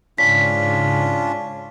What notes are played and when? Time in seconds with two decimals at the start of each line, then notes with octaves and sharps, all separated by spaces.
0.18 G#2 C#3 C#4 D4 F4 B6